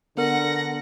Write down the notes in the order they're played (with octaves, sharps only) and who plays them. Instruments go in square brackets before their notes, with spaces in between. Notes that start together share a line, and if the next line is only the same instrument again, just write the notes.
[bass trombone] D3 [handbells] B3 A#4 [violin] F#5 A#6